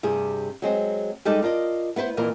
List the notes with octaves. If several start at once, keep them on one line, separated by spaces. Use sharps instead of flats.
G2 C3 G#4
F#3 G#3 C4
G3 G#3 D#4 G4 A4 D5
F4 A#4 D5 D#5
B3 E4 B4 C5
F2 A#2 E3 A#4